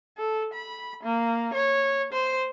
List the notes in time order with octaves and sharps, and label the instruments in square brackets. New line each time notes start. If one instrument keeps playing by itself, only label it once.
[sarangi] A4
B5
A#3
C#5
C5